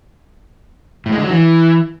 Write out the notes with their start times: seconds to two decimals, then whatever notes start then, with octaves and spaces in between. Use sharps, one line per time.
1.06 A2
1.12 G#3
1.18 D3
1.24 F#3
1.30 E3